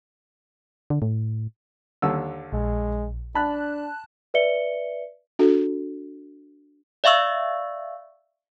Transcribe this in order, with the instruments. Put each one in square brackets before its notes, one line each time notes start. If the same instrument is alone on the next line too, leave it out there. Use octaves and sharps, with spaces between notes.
[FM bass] D3
A2
[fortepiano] D#2 D3 E6
[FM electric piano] A#1 [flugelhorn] G#3
[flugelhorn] D4 [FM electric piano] A5 F#6 [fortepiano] B5
[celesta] B4 D5 E5 C#7 G7
[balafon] D4 F#4 A4
[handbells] D5 E5 F5 C#6 E6